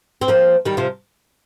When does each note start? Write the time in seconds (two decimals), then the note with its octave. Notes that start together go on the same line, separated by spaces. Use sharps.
0.21 C4
0.28 F3 A#3
0.65 D#3 G3
0.77 C3 F3